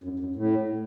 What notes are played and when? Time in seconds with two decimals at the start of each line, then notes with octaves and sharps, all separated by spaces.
0.04 F#2
0.19 F#2
0.36 A2